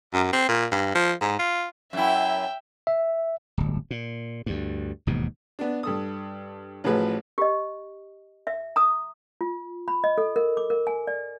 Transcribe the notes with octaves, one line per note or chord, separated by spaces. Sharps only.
F#2
C4
A#2
G2
F3
G#2
F4
F#2 E4 E5 G5
E5
D1 G1
A#2
D2 G2
E1 D#2 G#2 B2
B3 D4
G2 A4 D#6
A1 A2 F3 F#3 G#4 B4
G4 D#5
E5
A#5 D#6
F4
B5
D#5
A4
A#4
D6
A#4
G#5
D5